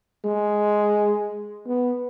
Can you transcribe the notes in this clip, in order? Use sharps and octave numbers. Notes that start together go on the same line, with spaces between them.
G#3
B3